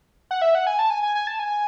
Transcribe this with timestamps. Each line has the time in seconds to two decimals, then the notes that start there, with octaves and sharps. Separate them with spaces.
0.31 F#5
0.42 E5
0.55 F#5
0.67 G#5
0.79 A5
0.90 G#5
1.03 G#5
1.15 G#5
1.27 A5
1.39 G#5